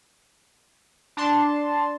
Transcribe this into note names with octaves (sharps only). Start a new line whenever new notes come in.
D4 A5 C6